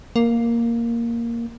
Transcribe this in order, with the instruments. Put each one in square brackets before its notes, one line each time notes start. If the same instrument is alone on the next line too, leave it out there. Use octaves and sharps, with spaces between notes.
[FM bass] A#3